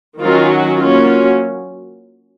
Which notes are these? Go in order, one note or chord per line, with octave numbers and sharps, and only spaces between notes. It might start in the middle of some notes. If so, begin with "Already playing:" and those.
D#3 F#3 C#4 F4
F#4
F#3 A#3 C#4 F4